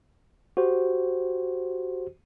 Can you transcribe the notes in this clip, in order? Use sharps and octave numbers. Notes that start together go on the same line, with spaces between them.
F#4 G4 C5